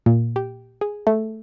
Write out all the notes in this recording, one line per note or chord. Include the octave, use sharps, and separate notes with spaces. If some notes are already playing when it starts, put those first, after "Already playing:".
A#2
G4
G#4
A3